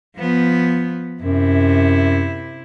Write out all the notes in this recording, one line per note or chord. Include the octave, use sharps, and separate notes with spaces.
F3 B3
F#2 C3 E4